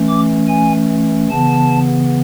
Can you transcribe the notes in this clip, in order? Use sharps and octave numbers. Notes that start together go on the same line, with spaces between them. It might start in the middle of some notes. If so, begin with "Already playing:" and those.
Already playing: E3 A3 C#4
D6
G#5
C#3 E3 B3 A5